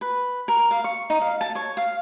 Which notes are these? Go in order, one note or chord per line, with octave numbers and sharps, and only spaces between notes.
B4
A#4
F5
C#6
D#4
F5
A5
C#5
F5